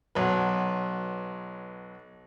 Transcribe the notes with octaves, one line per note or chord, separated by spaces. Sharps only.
B1 F#3 B4